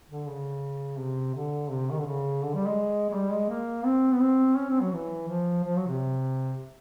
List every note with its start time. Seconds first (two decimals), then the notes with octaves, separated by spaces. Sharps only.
0.10 D3
0.27 C#3
0.99 C3
1.35 D3
1.71 C3
1.91 D#3
1.99 D3
2.07 C#3
2.43 D3
2.55 G3
2.66 G#3
3.09 G#3
3.13 G3
3.32 G#3
3.49 A#3
3.85 C4
4.13 B3
4.21 C4
4.57 C#4
4.70 C4
4.81 F#3
4.94 E3
5.28 F3
5.64 F3
5.76 F#3
5.88 C3